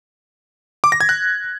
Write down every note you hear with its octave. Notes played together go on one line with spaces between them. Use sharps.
D6
A#6
G#6
F#6